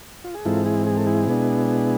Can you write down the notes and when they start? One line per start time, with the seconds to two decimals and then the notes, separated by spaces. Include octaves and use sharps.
0.24 F4
0.34 G#4
0.45 G#2 E3 G#3 C4 E4 F4 A4
0.66 E4 G#4
0.86 G#4
0.97 A4
1.07 E4 G#4
1.28 B2 G#3 B3 D4